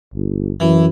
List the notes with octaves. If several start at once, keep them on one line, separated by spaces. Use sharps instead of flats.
G1
F#2 E3